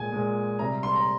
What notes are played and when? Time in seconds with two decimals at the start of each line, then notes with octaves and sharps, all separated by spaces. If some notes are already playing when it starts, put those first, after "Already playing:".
Already playing: A#2 G#3 G#5
0.12 A#2 G#3
0.59 C3 G3 A#5
0.83 C6
0.95 A#5